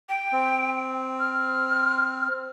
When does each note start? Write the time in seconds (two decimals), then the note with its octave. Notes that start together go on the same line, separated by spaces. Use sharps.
0.09 G5
0.32 C4
1.19 F6